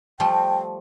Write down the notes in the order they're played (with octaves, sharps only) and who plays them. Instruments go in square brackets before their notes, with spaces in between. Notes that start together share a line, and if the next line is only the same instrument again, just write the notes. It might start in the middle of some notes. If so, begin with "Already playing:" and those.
[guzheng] F3 G3 A3 [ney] G5